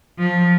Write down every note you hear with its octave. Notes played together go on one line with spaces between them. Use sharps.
F3